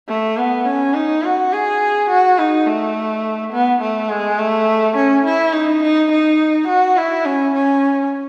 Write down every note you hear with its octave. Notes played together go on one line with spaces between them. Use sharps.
A3
B3
C#4
D#4
F#4
G#4
F#4
D#4
A3
B3
A3
G#3
A3
C#4
E4
D#4
D#4
D#4
F#4
E4
C#4
C#4